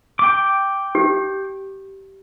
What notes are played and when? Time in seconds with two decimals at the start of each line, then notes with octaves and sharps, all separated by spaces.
0.19 G5 D6
0.95 G4